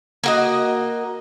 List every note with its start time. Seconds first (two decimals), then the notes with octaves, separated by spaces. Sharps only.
0.24 A#3 F#4 D#5